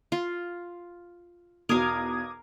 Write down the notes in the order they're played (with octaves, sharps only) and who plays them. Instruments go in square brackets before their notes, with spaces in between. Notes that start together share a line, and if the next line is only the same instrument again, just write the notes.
[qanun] F4
[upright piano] B1 E2 B2 [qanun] A#4 F5 [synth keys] D6 D#6 G#6